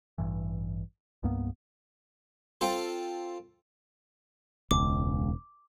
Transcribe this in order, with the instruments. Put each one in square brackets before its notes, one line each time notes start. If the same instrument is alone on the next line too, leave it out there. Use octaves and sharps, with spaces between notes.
[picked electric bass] A1 G2 E3
C2 G2 A#3 B3
[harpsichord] C4 F4 A4 C5
[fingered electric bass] E1 [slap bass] C#2 [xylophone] D6